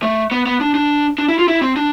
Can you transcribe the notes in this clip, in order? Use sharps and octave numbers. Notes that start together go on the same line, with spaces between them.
A3
B3
B3
D4
D4
D4
E4
F4
E4
C4
D4